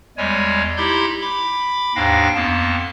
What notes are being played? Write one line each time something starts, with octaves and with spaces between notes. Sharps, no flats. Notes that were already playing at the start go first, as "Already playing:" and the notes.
E2 G3 G#3 C#5 G#5
D#4 E4 G4 B5 C6 G6
B5 D6
D#2 G#2 D4 F5 G5 A#6
F2 A#3 B3 A5